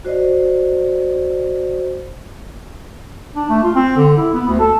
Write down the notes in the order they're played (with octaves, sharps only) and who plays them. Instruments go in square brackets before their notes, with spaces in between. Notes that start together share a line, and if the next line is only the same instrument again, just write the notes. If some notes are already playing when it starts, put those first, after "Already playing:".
[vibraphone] F#4 C5 D5 D#5
[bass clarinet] D4
A3
F4
C4
D3
E4
B3
D2
A4